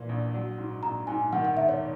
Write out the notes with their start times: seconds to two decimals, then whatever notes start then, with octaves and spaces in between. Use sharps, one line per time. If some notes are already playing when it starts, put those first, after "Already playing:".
Already playing: A#2 E3
0.09 A#1
0.34 F#3
0.58 G#2
0.83 A#1 A#5
1.07 G#2 G#5
1.33 D#3 F#5
1.45 F#5
1.56 E1 E5
1.69 C#5